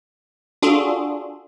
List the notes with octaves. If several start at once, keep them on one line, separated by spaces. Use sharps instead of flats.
D4 F4 F#4 G#4 A4